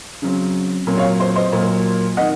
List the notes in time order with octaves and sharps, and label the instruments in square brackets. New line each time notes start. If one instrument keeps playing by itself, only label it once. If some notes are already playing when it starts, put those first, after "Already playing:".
[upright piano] C#3 F#3 C4
A#2 F#3 C4
C#5 F5
C5
C5 D#5
A#2 F#3 A#3
C3 D#3 D#5 F#5